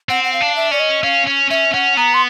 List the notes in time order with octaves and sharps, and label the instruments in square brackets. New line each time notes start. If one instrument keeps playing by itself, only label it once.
[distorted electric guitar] C4 [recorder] F#5
[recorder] F#5
F5
[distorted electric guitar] D4
[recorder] E5
[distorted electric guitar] C#4 [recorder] D5
[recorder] D#5
[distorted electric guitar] C#4 [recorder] F5
[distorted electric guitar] C#4
[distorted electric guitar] C#4 [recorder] E5
[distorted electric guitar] C#4 [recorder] F#5
[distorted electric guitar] B3 [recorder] A#5
[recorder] C6